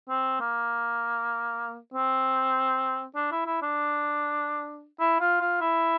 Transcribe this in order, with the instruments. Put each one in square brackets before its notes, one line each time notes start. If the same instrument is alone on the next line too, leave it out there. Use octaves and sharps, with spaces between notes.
[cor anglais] C4
A#3
C4
D4
E4
E4
D4
E4
F4
F4
E4